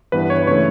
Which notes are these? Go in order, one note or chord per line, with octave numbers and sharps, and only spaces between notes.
G2 E3 B3 B4
C#5
C#3 E3 A3 C#5